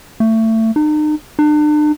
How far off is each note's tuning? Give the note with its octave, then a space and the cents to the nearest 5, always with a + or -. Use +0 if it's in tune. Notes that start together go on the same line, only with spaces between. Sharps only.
A3 +25
D#4 -40
D4 +40